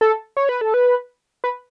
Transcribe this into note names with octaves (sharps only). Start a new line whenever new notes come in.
A4
C#5
B4
A4
B4
B4